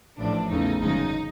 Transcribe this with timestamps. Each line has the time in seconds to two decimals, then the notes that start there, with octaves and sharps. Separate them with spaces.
0.18 A1 A2 F3 D4
0.48 E2 C#3 F#3 A3 D#4
0.79 G1 F#2 C#3 F3 G#3 D#4